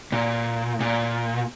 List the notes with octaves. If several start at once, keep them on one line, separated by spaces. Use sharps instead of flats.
A#2
A#2